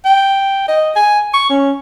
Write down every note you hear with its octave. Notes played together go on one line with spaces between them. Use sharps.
G5
D#5
G#5
C#6
C#4